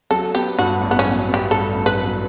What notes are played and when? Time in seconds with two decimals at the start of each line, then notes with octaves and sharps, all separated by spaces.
0.11 F#3 A4
0.35 B3 G4
0.58 G2 F#4
0.81 A1
0.91 B3
0.99 C#4
1.05 F#3
1.28 B3
1.34 G4
1.51 G2 A4
1.74 A1
1.86 B4
1.99 F#3